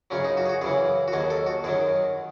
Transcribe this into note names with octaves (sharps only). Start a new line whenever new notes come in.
F#2 C#3 F#3 C#4
D#4
F#4
G#4
F#4
F#2 C#3 E3 G#4
F#4
D#2 D#3 F#3 G#4
A4
F#4
F#2 D#3 F#3 G#4